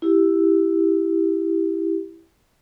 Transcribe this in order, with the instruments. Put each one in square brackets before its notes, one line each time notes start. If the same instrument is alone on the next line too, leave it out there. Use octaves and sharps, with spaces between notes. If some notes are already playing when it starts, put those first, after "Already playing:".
[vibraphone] E4 G4